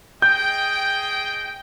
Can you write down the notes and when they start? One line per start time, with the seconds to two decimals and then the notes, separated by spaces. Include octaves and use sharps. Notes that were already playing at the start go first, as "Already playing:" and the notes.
0.22 G#4 D#5 G5 G6